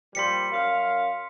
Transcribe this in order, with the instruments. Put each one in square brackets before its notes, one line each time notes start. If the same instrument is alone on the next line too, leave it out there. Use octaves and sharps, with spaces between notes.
[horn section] A#2 F3 G3 [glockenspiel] C6 B6 C#7
[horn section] F#2 F5